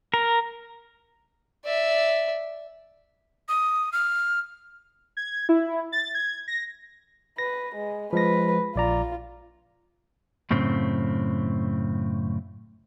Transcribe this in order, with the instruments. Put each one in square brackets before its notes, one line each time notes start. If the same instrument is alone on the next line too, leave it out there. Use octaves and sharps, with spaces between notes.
[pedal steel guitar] A#4
[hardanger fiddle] D5 E5
[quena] D#6
F6
[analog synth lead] G#6
E4
A6
G#6
A#6
[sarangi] B4 [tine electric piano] A#6
[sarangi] G#3
[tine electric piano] F3 G#3 A#6 [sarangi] B4
[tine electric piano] A#1 D5 A#5 [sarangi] F4
[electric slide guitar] F#2 A2 C#3 C4